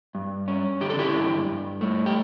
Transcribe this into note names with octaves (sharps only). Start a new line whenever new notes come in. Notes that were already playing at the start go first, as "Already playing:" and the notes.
G2
C#4
D3 G4
A4
E4 G4
G2
G2
A3
G4